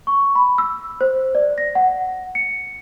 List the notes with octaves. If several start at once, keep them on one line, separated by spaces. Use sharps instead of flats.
C#6
B5
E6
C5
D5
A#6
F#5
C#7